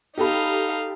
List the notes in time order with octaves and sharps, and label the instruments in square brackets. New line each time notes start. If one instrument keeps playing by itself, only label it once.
[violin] D#4 F5 [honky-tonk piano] G4 A4 B5